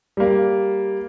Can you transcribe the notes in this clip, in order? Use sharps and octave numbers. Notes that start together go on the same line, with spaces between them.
G3 A#3